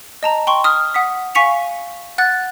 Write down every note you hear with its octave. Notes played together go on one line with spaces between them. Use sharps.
D#5 A5 A#5
G5 C6 C#6
D#6 F6
F#5 D#6 B6
F5 G#5 C#6 B6 C#7 F7
F#5 F#6 A6